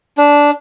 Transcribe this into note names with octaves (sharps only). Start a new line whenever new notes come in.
D4